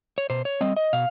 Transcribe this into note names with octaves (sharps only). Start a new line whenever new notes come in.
C#5
B2 C5
C#5
G3 C4 D#5
D#5
B2 F5